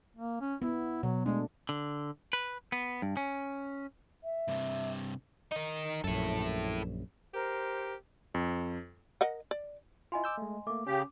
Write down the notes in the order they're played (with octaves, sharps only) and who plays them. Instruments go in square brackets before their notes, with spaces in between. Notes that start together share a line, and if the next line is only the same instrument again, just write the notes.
[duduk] A#3
C#4
[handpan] B3 [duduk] E4
[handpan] B2 [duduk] F#3
[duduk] G#3 [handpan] A3 D4
[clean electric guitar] D3
B4
B3
G2
C#4
[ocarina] E5
[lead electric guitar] G2 C3
[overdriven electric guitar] D#4 A#4
[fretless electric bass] A#1 F#2 [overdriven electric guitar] E4 A4
[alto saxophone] G4 [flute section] A#4 C5
[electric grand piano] F2
[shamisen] A#4 D#5 F#5
D5
[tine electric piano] E4 F4 [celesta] D#5 G#5 C6
[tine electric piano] D6 E6 G6
G#3 A3
[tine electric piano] A3 A#3 [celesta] D6
[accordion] C#3 G4 [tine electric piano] C#4